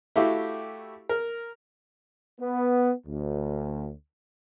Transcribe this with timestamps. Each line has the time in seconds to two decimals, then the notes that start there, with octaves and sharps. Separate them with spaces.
0.16 A3 E4 F#4 G4 F5
1.09 A#4
2.41 B3
3.07 D2